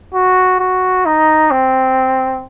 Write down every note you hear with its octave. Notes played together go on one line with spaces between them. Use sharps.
F#4
F#4
D#4
C4